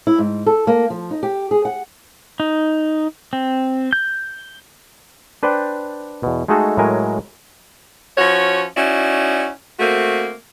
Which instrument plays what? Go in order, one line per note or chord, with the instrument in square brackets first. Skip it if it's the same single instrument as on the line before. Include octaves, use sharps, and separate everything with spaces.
[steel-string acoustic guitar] E4
G#2
A4
A#3
F3
D#4
G4
G#4
F#5
[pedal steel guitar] D#4
C4
G6
[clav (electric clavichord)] D4 B4 C5 D5 G5
E2 B2
G#3 A3 D#4 F#4 G#4 A4
A2 F#3 G#3 A#4 G#5
[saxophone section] F3 C#4 F#4 C#5
C#4 D#4 E4 F#4 D5
A3 A#3 C4 F#4